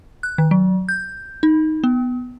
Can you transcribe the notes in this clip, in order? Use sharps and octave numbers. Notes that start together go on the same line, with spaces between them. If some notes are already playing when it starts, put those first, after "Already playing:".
F#6
D#3
F#3
G6
D#4
B3